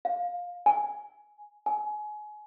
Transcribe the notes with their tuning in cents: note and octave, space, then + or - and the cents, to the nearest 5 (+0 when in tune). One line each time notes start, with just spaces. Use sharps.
F5 +15
G#5 +10
G#5 +25